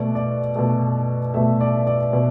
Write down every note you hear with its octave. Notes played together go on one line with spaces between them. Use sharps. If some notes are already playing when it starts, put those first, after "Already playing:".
Already playing: B2 A3 D5
D5
B2 A3
B2 A3 E5
D5
D5
B2